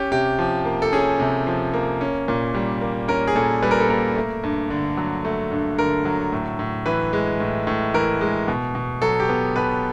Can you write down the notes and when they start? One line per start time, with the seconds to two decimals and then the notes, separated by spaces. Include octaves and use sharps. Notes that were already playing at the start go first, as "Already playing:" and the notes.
Already playing: C#4 G4
0.12 C3 G4
0.39 F3
0.65 A#3
0.82 A4
0.92 C#4 G#4
1.20 C3
1.47 F3
1.74 A#3
2.01 C#4
2.28 A#2
2.55 G3
2.81 A#3
3.08 C#4 A#4
3.27 G#4
3.35 A#2 A4
3.62 G3 B4
3.71 A#4
3.80 A4
3.89 A#3 A#4
4.16 A3
4.43 G2
4.70 D3
4.97 F#3
5.25 A3
5.51 G2
5.78 D3 A#4
6.05 F#3
6.32 A2
6.59 A2
6.86 E3 B4
7.13 G#3
7.40 A2
7.67 A2
7.94 E3 A#4
8.21 G#3
8.48 B2
8.75 B2
9.02 F#3 A4
9.20 G4
9.29 B3
9.56 B2 B4